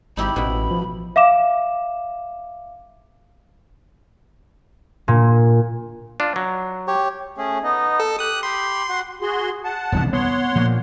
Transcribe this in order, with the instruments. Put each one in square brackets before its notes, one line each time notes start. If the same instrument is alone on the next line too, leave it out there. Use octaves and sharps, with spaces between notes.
[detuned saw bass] G#1 [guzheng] D#4 E4 G4 [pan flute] B5
[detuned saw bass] A1 [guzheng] B2 E4
[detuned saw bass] F3
[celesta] E5 F5 D6 E7
[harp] A#2
[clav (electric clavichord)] D4 F4
F#3
[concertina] G4 C#5
[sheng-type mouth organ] A3 C#4 G#4
B3 D#4 D#5
[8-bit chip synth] A4
[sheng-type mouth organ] G4 [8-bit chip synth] D#6 F#6
[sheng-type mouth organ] G4 B5 [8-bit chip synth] C6
[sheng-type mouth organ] F#4 F#5
[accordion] F#4 G#4 C6
F#5 A5
[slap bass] E1 C2 D#3
[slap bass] B3 [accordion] C#5 F#5 C6
[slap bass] A#2 F3 A#3